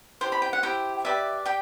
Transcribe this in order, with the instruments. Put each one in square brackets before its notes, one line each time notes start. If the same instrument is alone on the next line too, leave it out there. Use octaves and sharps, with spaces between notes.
[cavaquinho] E4 G4 C5 C6
B5
G5
F#5
E4 G4 C5 G5
G4 B4 D5 E5
G4 G5